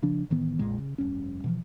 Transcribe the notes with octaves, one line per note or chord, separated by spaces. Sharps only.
C#3 F3 D4
A2 D#3 E3 B3
B1 F2 A#2 G#3
C#3
F1 G2 C#4
B2 E3 F3